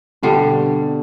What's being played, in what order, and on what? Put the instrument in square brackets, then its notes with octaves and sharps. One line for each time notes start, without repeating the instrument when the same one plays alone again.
[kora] G2 D3 G3 [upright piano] B2